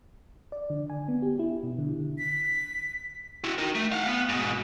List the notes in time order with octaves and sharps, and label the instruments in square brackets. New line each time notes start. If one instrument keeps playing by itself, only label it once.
[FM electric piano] D5
D3
G#5
B3
G4
E4
B2
D3
[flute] B6
[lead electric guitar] E4 F#4
D#4 A#4
A3
F5 F#5
B3
G#2 B2